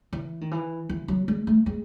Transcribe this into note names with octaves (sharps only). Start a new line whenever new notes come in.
E3
D#3
E3
E3
F#3
G#3
A3
G#3